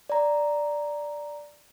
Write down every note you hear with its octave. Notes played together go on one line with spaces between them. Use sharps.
D5 A#5